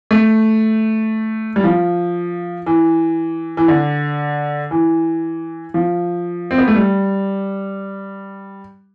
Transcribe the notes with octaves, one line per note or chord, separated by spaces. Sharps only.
A3
G3
F3
E3
E3
D3
E3
F3
C4
B3
A3
G3